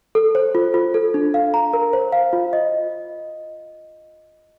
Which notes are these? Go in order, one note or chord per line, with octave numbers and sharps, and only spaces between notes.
A4
C5
F4
F4
A4
D4
F5
A#5
A#4
C5
F5
F4
D#5